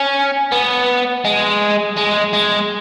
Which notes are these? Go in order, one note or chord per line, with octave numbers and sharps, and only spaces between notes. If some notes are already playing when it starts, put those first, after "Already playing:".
Already playing: C#4
B3
G#3
G#3
G#3